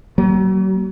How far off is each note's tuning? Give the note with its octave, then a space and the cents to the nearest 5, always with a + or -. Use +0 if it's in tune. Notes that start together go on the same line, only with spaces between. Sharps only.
F#3 +40 A#3 +0